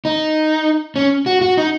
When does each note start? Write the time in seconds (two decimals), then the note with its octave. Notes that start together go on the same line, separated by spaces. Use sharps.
0.05 D#4
0.96 C#4
1.26 F#4
1.42 F#4
1.57 D#4